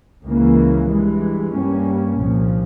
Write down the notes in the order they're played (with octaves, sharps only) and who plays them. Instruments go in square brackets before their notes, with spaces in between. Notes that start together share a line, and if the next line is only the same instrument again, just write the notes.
[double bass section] C#2 C#3 E3 A#3
G2 E3 G#3
G2 G3 A#3 C#4
C2 A#2 F3